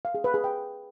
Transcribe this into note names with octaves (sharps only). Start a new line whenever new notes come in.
F5
G#4
B4
G#4
G5